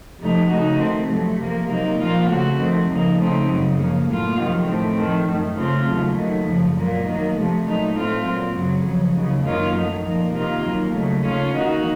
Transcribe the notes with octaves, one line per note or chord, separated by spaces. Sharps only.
F2 C3 F3 A3 D#4
C#3 A3 D#4 F#4
D#3 A3 C4
F2 C3 F#3 A3
C3 F3 A#3
C3 F#3 A#3 D#4
A#2 F3 A#3 F4
C#3 A3 C4 F#4
F2 D#3 A3 C4
F2 C#3 F3 A#3 D#4
C#3 A3 C4 D#4
F#2 C#3 F#3
C#3 F3 A#3
A2 F#3 A#3 F4
F2 C3 D#3 F#3
A2 A3 C4
F2 D#3 A3
F#2 D#3 A3
C#3 A3 C4 F4
D#2 C#3 F#3 A3
D#2 D#3 F#3 A3
F#2 C#3 F3
A#2 F#3 A#3
D#3 F#3 A#3
C3 F3 A3
A#2 F#3 A3 D#4
A2 A3 C4 F4
A#2 F#3 C4
F#2 C#3 F#3
F2 C#3 F#3
D#2 C#3 F#3
F#2 D#3 A#3 C#4 F4
D#3 F#3 A3 D#4
A#2 F3 A#3
C3 D#3 A#3 F4
D#2 D#3 F#3 A#3
D#2 C#3 F#3 A3
C#3 A3 C#4 F4
D#3 A#3 D#4 F#4